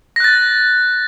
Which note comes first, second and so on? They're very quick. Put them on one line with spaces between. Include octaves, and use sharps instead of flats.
A#6 F#6 A6